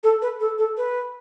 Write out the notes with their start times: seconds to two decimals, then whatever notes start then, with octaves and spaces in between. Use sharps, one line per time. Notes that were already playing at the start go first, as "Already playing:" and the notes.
0.03 A4
0.22 B4
0.40 A4
0.58 A4
0.77 B4